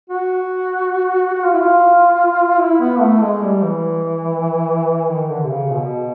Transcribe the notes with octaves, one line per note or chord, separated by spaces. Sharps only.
F#4
F#4
F4
E4
F4
E4
B3
A3
G#3
G3
E3
D#3
D3
C3
C#3
B2